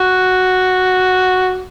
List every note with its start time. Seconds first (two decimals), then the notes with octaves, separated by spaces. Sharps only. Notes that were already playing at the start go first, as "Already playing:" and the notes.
Already playing: F#4